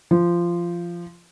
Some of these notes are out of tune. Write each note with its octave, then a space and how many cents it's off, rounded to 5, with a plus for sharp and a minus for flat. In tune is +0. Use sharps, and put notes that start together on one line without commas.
F3 -15